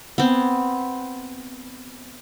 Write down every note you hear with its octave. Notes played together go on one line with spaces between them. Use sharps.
B3 C4